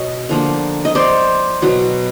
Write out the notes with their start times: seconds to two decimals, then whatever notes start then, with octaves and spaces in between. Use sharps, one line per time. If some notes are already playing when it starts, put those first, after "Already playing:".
Already playing: B2 C#5 D#5
0.29 D3 F3 A#3
0.85 D#5
0.95 C5 D5
1.62 B2 F#3 B3